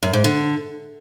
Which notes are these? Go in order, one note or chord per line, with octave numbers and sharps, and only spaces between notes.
F#2
G#2
D3